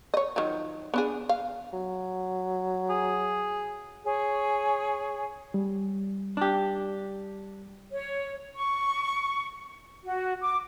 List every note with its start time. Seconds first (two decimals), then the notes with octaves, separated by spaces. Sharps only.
0.14 C#5 D#5
0.36 D#3 F3 F#3
0.94 B3 D4 G#4
1.29 F5
1.73 F#3
2.90 G#4
4.03 G#4 C#5
5.54 G3
6.37 D4 G4
7.91 C#5
8.55 C#6
10.04 F#4
10.41 D6